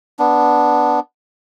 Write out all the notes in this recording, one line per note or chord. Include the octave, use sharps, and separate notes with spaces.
B3 D4